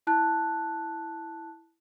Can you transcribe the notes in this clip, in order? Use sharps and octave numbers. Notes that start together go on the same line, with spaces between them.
E4 A5 F#6